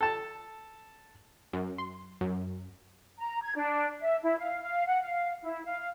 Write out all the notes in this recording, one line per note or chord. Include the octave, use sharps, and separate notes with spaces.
A4 A5
F#2
C6
F#2
A#5
G#6
D4
E5
E4
F5
F5
F#5
F5
E4
F5